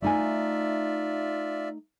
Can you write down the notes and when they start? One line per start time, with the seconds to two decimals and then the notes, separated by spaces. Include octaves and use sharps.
0.02 A3 D#4 F4 D5 E5 G#5